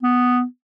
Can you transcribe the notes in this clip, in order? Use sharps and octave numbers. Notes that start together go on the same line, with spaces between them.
B3